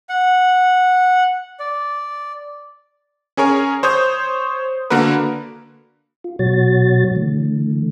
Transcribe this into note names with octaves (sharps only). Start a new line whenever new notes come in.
F#5
D5
C#4 G#4 A#4 C#5 G#5
C5 C#5 D#6 G6
D3 A#3 F#4 A#4 B4
F4
B2 F#3 F#4 C#5 A6
D3 E3 A3